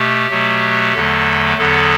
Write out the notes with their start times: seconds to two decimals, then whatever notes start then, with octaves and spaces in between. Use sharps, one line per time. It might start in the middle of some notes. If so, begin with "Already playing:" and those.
Already playing: B2 A3 G4
0.30 B2 F#3 A3
0.94 E2 D3 F#3 A3 A4
1.57 E2 D3 F#3 B3 A4